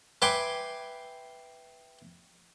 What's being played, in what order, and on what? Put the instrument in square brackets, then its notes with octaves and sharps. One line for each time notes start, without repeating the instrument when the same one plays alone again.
[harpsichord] B4 E5 G5 G#5 C6 D6